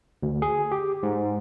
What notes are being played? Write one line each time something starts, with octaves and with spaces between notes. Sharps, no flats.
D2
G#4
G4
G#2